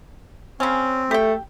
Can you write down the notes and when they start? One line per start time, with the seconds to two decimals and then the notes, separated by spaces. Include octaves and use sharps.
0.60 C#3 C4 C#4
1.11 A3 G4 G5